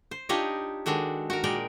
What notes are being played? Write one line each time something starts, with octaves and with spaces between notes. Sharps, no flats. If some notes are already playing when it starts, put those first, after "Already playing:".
C5
D4 D#4 F4 G4 C#5 D#5
D#3 G#3 D4 F#4 A4
F#4 A#4
A#2 G#3 A#4 D5 G5